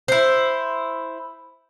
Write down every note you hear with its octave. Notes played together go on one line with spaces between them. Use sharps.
E4 C5